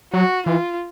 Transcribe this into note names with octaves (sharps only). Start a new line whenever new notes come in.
F#3 F#4
E3 F4